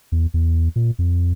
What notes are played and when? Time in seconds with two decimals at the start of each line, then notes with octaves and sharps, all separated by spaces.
0.12 E2
0.34 E2
0.76 A#2
0.99 F2